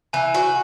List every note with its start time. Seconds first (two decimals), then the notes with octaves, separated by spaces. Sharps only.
0.13 E3 G#5
0.34 F#4 G#5